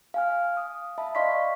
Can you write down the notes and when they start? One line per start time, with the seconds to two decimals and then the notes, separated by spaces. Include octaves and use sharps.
0.14 F5 G#5 F6
0.57 D#6
0.98 E5 A5 B5
1.15 D5 D#5 F5 C6 C#6 B6